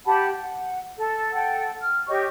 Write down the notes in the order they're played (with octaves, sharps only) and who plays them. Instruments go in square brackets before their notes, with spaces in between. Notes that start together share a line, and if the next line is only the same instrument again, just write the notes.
[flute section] G4 F#5 A5 B5
F#5
A4
A4 F#5 G5
F6
G4 C#5 D#5 C#6